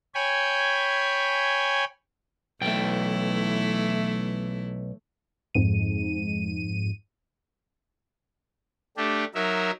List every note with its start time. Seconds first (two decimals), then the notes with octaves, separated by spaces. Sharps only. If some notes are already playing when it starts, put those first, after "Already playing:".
0.15 C#5 G5 G#5 B5
2.61 B1 E3 A3 E4 G5
5.55 F2 G#2 D#7
8.97 A3 D4 G4
9.34 F#3 D#4 A#4 E5